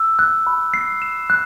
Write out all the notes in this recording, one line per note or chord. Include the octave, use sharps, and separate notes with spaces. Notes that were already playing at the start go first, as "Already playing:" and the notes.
Already playing: E6
F#6
B5
C7
E7
F#6